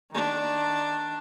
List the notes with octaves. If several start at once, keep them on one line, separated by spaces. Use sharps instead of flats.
D#3 D4